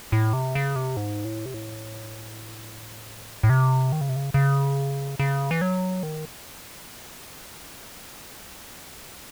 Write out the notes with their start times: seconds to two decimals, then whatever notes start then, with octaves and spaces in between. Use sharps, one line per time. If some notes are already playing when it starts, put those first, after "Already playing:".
0.12 A2
0.33 C3
0.55 C#3
0.76 C3
0.97 G#2
1.25 A2
1.46 C3
1.54 A2
3.43 A2
3.50 C3
3.92 D#3
4.01 C#3
4.09 C3
4.16 C#3
4.34 C#3
5.19 C#3
5.51 E3
5.62 F#3
6.03 D#3